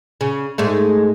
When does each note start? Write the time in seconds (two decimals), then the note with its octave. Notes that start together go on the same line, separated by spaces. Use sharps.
0.21 C#3
0.58 G#2 G#3 A3